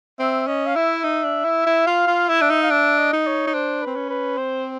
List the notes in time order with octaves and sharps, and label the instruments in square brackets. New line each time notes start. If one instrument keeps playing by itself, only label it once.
[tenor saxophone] C4 [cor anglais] E5
[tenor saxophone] C#4 [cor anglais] D#5
[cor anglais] F5
[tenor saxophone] E4 [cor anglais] E5
[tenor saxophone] D#4
D4
E4
E4
[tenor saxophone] F4 [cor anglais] F5
[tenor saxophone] F4
[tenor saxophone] E4 [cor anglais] E5
[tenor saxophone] D4
D#4
[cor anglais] F5
[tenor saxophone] D4 [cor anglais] E5
[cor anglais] D#5
[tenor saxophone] D#4
[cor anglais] C#5
[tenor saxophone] D#4
[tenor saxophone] D4 [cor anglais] C5
[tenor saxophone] C4 [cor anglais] B4
[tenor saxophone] C#4
[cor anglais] B4
[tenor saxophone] C4 [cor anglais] C5